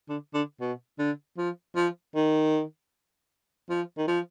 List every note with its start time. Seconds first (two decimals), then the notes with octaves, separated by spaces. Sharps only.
0.09 D3
0.34 D3
0.61 B2
0.99 D3
1.38 F3
1.76 F3
2.15 D#3
3.70 F3
3.98 D#3
4.08 F3